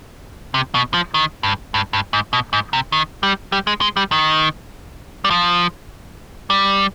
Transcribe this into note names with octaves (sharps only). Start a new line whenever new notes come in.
C3
B2
F3
D#3
G2
G2
G2
G#2
B2
G#2
C3
D#3
G3
G3
G#3
G#3
G3
D#3
G3
F3
G3